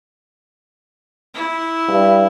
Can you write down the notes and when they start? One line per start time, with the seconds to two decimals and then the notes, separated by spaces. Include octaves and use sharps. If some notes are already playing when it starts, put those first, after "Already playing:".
1.35 E4
1.88 G2